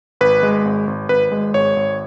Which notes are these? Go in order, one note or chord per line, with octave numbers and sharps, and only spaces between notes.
G#1 B4
G#3
G#1
G#1
G#1 B4
G#3
G#1 C#5
G#1